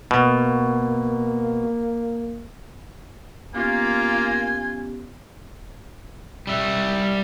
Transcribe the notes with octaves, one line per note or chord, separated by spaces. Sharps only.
B2 A#3
A#3 B3 C#4 F4 G4 G#5
G3 E5